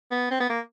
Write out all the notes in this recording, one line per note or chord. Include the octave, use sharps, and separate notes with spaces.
B3
C4
B3
A#3